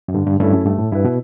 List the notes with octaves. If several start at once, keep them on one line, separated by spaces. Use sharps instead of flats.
F#2
G2 D3
G2
G2 A3 C#4 E4 A4
F#2
G2 A3
A2
G2 E4 B4
B2